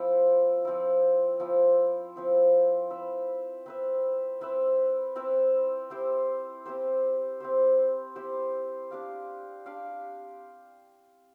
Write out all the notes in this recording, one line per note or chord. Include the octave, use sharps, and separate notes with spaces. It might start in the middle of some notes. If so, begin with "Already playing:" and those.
Already playing: F3 C4 E4
F3 C4 E4
F3 C4 E4
F3 C4 E4
C4 E4 B4 E5
C4 E4 B4 E5
C4 E4 B4 E5
C4 E4 B4 E5
C4 E4 G4 C5
C4 E4 G4 C5
C4 E4 G4 C5
C4 E4 G4 C5
D4 G4 D5 F5
D4 G4 D5 F5